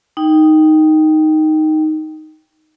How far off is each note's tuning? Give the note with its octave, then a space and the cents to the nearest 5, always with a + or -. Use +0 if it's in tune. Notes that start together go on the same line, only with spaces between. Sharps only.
D#4 +0 G5 +0